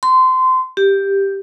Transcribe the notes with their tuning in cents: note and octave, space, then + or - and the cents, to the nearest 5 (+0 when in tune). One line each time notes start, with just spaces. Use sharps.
C6 -20
G4 +5